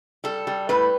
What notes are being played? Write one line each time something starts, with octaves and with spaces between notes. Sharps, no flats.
G3 A4
G3
A2 B4